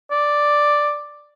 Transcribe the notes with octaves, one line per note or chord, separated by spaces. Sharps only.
D5